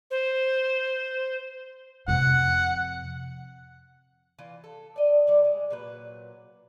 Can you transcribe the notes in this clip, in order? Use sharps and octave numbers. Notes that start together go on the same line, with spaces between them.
C5
F2 C3 F#5
E3 F4
A4
D5 D#5
G3 C#5 D5
G#3
A#2 F#3 B4